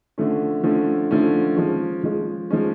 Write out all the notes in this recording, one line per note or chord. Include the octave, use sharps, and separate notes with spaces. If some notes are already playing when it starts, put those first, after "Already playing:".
D3 F3 A3 C#4
D3 F3 A3 C#4
D3 F3 A3 C#4
F3 G#3 C#4
F3 G#3 C#4
F3 G#3 C#4